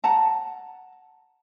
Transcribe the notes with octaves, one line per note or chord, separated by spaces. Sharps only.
F#5 A5 A#5